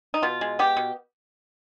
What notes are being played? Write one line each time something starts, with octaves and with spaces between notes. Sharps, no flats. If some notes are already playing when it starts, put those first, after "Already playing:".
D#4
B2 F4
G#3
B3 G4
B2